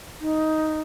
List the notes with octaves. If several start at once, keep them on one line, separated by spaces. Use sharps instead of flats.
D#4